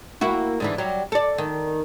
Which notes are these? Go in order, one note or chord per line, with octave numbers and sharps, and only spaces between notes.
A#3 E4 F#4
G#2 D3 E3
F#3 G3
A4 D5
D#3